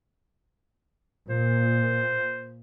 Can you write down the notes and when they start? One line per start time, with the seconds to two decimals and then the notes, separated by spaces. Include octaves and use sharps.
1.30 A#2 C5